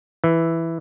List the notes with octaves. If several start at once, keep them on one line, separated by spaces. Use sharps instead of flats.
E3